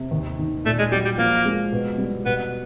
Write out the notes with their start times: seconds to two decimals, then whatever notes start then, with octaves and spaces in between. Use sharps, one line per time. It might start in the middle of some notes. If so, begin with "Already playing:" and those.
Already playing: C3
0.11 D#2
0.39 D#3
0.65 A#2 A3
0.79 G#3
0.92 F#3 G3
1.05 G3
1.18 F3 A#3
1.46 G#3
1.72 B2
1.98 G3
2.26 B2 B3